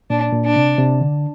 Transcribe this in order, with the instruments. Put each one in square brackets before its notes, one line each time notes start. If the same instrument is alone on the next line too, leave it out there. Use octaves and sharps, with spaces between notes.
[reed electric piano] A#2 [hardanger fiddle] D4
[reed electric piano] A#2
[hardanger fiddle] D4
[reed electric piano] C3
C3
D3